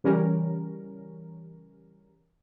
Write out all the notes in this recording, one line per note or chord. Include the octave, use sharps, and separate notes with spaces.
C#3 E3 G3 C#4 A#4